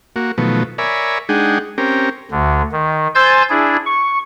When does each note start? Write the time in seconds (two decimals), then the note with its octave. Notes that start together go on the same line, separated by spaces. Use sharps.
0.16 A#3 F#4
0.38 B2 D#3 F3 F#3 A3 B3
0.78 A#4 C#5 D5 E5 G#5 B5
1.29 G#3 D4 D#4 G#4 F#5 G5
1.78 C4 C#4 G4 A#4
2.31 D2 D3
2.72 D#3
3.15 C5 G#5 C6 E6 G6 A6
3.50 D4 E4 G#4
3.86 C#6